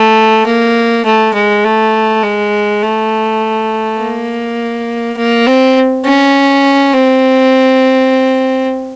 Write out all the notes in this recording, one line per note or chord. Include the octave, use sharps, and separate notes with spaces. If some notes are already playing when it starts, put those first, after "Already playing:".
Already playing: A3
A#3
A3
G#3
A3
G#3
A3
A#3
A#3
C4
C#4
C4